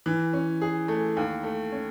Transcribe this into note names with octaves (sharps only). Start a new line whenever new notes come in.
E3
C#4
G#4
A3
D#2
A3
C#4